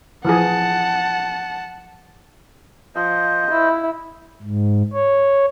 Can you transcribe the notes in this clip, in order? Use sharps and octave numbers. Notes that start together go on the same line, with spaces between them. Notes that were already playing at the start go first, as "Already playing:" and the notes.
E3 F3 G#4 F#5 A5
F3 C5 D#5
E4
G#2
C#5